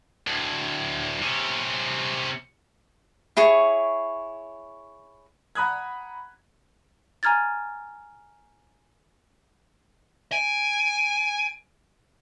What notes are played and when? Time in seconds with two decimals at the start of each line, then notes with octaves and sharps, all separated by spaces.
0.27 D2 A2
1.22 C3 C#4
3.37 E4 G#4 C#5 C#6
5.55 F#5 A#5 B5 D#6 F#6 G#6
7.23 G#5 A#5 F6 G#6 A6
10.32 G#5 D7